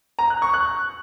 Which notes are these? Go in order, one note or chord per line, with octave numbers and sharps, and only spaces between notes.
A#5
F#6
C#6
F#6